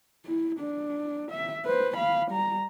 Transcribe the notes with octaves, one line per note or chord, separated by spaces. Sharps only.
E4
D4
E5
B4 C5
F5 B5
G3 A#5